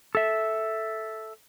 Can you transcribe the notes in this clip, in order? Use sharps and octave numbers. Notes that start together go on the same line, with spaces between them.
A4 E5